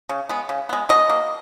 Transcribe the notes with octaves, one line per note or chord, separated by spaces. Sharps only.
C#3
G#3 B3
C#3
G#3 B3
B2 D#5
A#3